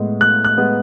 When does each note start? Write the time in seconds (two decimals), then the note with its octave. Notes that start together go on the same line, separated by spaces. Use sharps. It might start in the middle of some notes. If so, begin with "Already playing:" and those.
Already playing: A2 G#3 B3
0.21 A2 F#6
0.45 F#6
0.57 G#3 B3